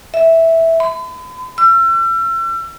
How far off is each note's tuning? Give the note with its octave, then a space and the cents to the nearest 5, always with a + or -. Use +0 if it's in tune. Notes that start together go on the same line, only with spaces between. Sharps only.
E5 -5
B5 +40
E6 +40